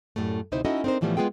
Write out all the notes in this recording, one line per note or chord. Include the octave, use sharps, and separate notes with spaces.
F#2 A2 G3 A3
D2 C3 D#4 E4 C5
C#4 D#4 E4 F#4 A4 D#5
C4 D4 D#4 A#4 C5
A2 E3 F3 G3 A3 B3
G#3 B3 F4 G#4 G5